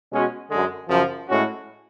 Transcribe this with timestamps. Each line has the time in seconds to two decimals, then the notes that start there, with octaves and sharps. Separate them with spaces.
0.10 B2 G#3 C#4 F#4
0.49 F#2 D3 G#3
0.88 F#2 C#3 F3
1.28 A2 G#3 C#4 F#4